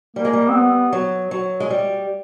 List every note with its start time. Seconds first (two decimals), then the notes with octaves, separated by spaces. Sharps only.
0.16 G3 A#3
0.25 G#3
0.33 G3
0.49 C4
0.55 B3
0.93 F#3
1.31 F#3
1.60 G#3
1.70 G3